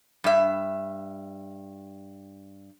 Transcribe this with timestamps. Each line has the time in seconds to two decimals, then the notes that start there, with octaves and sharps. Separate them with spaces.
0.24 G2 E5